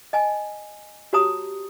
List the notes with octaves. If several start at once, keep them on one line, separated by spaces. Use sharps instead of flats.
D#5 G#5 A5
F#4 G4 C#5 A5 A#5 D#6